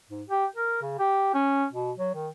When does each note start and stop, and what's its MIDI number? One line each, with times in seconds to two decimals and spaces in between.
0.10 0.22 44
0.29 0.46 67
0.56 0.79 70
0.82 0.97 49
0.99 1.30 67
1.34 1.66 61
1.73 1.92 47
1.97 2.14 54
2.15 2.28 51